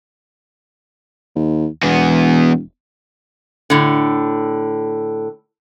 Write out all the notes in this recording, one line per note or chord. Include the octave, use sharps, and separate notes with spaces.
D#2
E1 E2 B3
A2 D3